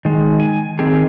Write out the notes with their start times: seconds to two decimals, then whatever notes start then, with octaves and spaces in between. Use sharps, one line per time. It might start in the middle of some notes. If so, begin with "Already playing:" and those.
0.05 D#3 G#3
0.40 G#5
0.79 D#3 C4 G4 G#4